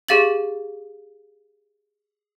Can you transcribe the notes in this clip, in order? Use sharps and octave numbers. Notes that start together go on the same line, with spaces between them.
G4 G#4 F5 A6 F#7